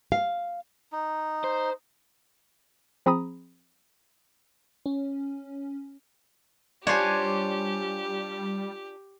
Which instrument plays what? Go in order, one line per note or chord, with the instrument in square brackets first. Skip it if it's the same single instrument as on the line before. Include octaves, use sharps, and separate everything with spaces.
[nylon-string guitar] F5
[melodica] D#4
[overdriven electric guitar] C5
[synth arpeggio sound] F3 C4 G#4 A#5 B5 D#6
[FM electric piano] C#4
[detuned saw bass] G3 [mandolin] D4 F4 G#5 [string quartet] G4 [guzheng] C5 C#5